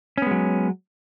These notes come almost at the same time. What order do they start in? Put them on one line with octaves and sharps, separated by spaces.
C#4 B3 G#3 F#3